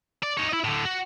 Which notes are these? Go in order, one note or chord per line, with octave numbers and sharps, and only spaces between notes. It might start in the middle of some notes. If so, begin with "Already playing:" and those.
D5
D#4 C#5
E4 D#5
A2 D3
F#4